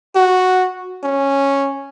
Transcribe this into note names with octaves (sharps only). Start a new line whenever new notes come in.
F#4
C#4